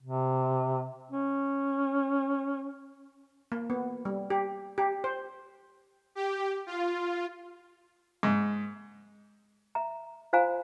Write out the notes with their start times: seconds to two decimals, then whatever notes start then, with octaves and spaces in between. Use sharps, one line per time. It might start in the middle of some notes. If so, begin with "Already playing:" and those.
0.03 C3
1.11 C#4
3.52 A#3
3.70 B3
4.05 G3
4.30 G4
4.78 G4
5.04 C5
6.15 G4
6.67 F4
8.23 G#2
9.75 E5 A#5
10.33 F4 C5 F5 G#5 A#5